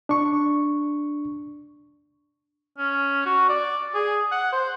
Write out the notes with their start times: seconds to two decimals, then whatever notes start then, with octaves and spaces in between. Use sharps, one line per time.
0.09 D4 C#6
2.78 C#4
3.26 F#4
3.49 D5
3.94 G#4
4.31 F#5
4.52 C5